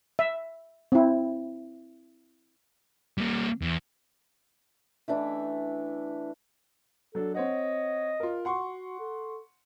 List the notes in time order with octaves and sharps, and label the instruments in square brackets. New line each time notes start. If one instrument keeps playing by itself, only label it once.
[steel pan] E5
C4 E4
[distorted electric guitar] G3 A#3
E2
[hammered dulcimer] E3 A3 D4 E4
[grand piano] F#3 D4 [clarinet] A4
[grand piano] C4 C#5 F#5 [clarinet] D#5
[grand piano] F4 A#4
[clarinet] F#4 [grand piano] F#5 C6 C#6
[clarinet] A4